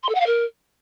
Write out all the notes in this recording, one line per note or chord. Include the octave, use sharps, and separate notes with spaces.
C6
A4
F#5
F5
A#4